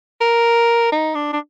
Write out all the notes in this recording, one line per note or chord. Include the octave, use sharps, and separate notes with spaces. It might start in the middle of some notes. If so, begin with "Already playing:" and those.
A#4
D#4
D4
D4